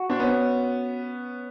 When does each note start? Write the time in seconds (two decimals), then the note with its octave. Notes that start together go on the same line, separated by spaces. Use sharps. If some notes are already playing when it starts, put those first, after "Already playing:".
Already playing: F#4
0.10 C4 D4
0.20 B3 C#4